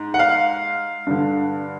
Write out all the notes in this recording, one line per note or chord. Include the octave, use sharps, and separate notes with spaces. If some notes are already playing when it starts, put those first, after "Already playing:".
Already playing: G#2
F#5
F5
G2 D3